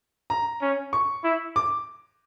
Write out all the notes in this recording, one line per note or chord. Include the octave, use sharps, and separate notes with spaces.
A#5
C#4
C#6
E4
D6